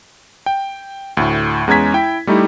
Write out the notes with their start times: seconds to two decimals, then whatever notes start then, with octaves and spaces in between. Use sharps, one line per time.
0.46 G5
1.17 D2 A2
1.67 E2 G#3 C#4 A#5 G#6 B6
1.94 E4 G5
2.27 G3 A3 D#4 E4 G4